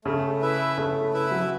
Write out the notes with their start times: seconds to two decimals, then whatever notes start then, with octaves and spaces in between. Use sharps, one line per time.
0.05 C#3 A3
0.41 E4 B4 E5
0.77 C#3 A3
1.13 E4 B4 E5
1.31 F#3